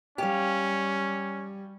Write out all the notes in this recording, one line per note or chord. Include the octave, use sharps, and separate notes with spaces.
G3 C#4 G4 F5